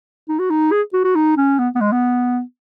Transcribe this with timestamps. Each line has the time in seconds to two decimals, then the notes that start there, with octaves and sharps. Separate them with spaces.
0.29 D#4
0.39 F#4
0.50 D#4
0.72 G#4
0.93 F#4
1.04 F#4
1.15 D#4
1.37 C#4
1.59 B3
1.75 B3
1.81 G#3
1.92 B3